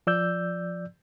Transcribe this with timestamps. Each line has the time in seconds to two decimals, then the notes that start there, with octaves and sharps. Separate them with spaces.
0.07 F3 D5 E6 G6